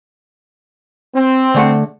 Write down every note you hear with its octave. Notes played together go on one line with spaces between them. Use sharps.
C4
D3 A3 F#5